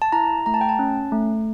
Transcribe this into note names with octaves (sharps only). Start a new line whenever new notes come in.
A5
E4 A#5
A3 A#5
A5
G5
A5
C#4
A3